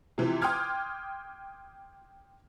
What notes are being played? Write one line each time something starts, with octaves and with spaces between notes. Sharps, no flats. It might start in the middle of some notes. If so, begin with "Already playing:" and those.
C3 E3 F3
G5 C6 D6 D#6 F6 G#6